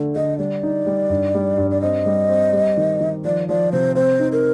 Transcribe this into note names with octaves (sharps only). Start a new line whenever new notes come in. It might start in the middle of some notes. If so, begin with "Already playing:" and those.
Already playing: D3 A3
D3 D#5
G3 D5
D#4
G3
G2
G3
G2
D5
C4 D#5
G3
C4
G3
D#3
D#3
F3 D5
F3 D5
C3 C5
C4 C5
D#4
A#4